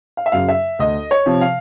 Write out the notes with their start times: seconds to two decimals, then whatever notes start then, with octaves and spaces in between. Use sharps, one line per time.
0.17 F5
0.26 E5
0.32 F#2 C#3 F#3 F5
0.48 E5
0.79 D2 D#5
1.11 C#5
1.26 C3 F3
1.41 F5